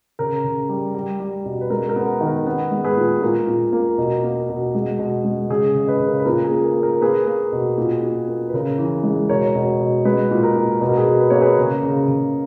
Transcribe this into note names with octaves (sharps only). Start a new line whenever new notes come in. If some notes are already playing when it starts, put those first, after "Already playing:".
C#3 A#4
C#3
G3
G3
G3
B2
B4
G#3 A#4
A#4
B3
D#3
A#4
B3
G#3
G#4 B4
A#2
A#2 A#4
A#2
A#3
B2
A#3
B2
G#3
B2
G#3
C#3 G#4
C#3
B4 D#5
C#3
A#4
B4
A#2 A#4
G#4
A#3
A#4
A#3
A#4
A#3 G#4 B4
A#3
B2
A#2
A#2
A#3
B4
C#3 A#4
E3
G#3
B2 A#4 C#5
B2
B2
G#3 G#4 B4
A#2
A#4
A#2
B2 B4
A#4
G#4 B4
B2
B4
A#3 C#5
G#4 B4
C#3
C#3
C#3